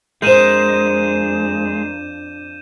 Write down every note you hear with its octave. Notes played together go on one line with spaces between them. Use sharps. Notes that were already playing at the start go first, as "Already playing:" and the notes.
F2 G#3 D4 A#4 C5 G6 D#7 E7